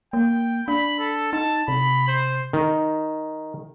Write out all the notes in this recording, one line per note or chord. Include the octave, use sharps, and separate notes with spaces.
A#3 G5
D4 B5
A4
D#4 A5
C3 B5
C5
D#3